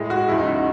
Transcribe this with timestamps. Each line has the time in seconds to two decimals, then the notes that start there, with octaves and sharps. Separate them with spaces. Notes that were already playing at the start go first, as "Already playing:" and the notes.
Already playing: A2 G#3
0.10 F#4
0.28 E2 C#3 G#3 E4
0.38 D#4
0.46 E4
0.55 F#4